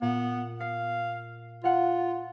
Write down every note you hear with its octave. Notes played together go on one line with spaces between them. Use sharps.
A#2 B3
F5 C7
F4 F5 F#5